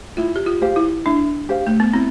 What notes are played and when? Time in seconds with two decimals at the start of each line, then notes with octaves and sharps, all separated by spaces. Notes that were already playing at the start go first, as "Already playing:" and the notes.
0.17 E4 F4
0.36 G4
0.46 F4
0.61 G4 C5 F5
0.76 E4
1.06 D4 E4
1.49 G4 C5 F5
1.67 A3
1.80 B3
1.94 C4 E4